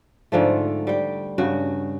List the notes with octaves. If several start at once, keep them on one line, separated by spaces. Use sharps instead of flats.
G#2 D3 F3 A3
G3 G5
G2 C#3 F#4